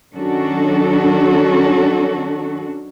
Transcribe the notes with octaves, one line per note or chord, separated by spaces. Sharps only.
D#3 F#3 C#4 D4 F#4 A4